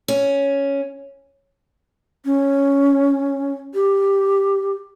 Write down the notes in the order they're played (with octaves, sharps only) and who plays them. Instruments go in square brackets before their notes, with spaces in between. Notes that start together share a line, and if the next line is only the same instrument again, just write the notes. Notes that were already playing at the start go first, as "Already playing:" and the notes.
[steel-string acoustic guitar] C#4
[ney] C#4
G4